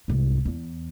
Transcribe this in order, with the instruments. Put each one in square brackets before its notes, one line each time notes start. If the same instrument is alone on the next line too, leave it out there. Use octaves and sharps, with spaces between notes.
[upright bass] C2 G#2
E2